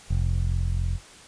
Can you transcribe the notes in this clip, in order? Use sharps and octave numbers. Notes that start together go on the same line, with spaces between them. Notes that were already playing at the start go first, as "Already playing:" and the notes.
F1